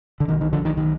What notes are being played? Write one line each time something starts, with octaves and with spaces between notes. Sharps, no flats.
D3
B1 B2 D#3
D#3
D3 F3
D#3
D#3